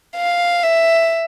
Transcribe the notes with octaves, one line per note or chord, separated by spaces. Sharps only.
F5
E5